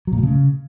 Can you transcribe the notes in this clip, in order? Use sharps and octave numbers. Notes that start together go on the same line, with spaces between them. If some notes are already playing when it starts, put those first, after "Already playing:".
F#3
A#2
A3
C#3